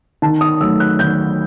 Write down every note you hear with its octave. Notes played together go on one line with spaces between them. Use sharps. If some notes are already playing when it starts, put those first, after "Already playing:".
D#3 A5
D#6
F#3 A3 E6
F#6
D#3 G6